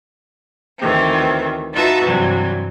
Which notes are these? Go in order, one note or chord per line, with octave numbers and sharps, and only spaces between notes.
D2 D#3 E3 C4
D#4 F4 F#4 B4 E5 A5
G2 C3 E3 F#3 G3